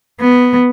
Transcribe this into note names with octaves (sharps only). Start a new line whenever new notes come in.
B3